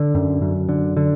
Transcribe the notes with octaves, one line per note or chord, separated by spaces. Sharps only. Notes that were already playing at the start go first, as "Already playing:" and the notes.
Already playing: D3
F#2
F#2
D3
D3